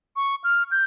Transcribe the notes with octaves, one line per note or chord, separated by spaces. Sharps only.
C#6
F6
G6